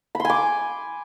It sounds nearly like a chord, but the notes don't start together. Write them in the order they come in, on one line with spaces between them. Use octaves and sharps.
B5 C6 G#5 D6